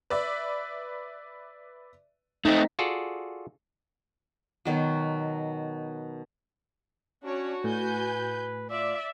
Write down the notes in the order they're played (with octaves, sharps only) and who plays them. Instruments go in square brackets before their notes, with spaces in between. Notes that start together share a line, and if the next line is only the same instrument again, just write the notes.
[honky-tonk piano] B4 D5 E5
[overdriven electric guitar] A3 C4 [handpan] D#4 [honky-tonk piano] D#6 A#6 B6
[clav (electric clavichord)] F4 F#4 G#4 A4 D5
[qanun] B2 D#3 F#3
[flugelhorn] C#4 [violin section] D4 C#5 [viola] F#4
[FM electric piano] A2 [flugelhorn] B4 [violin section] G#5 G6
[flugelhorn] F4 [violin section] D5 [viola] E5